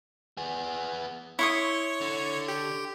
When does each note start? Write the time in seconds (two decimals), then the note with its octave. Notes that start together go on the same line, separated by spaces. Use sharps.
0.38 B3 G#4
1.39 E4 C#5 C6 C#6 D#6
2.01 D3
2.48 G4